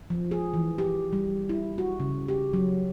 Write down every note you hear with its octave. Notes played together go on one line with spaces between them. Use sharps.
F3
G#4
E3
G4
G3
E4
F#4
C#3
G4
F#3